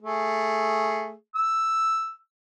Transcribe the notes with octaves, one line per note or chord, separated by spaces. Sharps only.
A3 G#4
E6